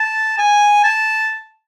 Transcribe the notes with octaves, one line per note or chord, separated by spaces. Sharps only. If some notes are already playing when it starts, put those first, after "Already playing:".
Already playing: A5
G#5
A5